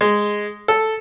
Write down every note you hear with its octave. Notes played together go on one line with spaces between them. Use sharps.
G#3
A4